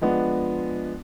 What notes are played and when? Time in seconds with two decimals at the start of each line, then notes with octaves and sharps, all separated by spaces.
0.01 F3 G#3 B3 D4